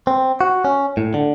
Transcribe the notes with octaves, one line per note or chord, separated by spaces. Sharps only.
C4
F#4
C#4
A2
D3